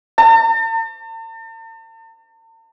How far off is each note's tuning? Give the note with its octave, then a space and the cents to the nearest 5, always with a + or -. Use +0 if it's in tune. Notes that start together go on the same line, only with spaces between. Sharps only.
A5 +45